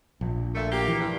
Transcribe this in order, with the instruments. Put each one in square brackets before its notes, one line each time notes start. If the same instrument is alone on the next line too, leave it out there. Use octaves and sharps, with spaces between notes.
[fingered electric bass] A#1
[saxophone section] A#2 A3
A#3 F#4 G4
[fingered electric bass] E3
[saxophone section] G2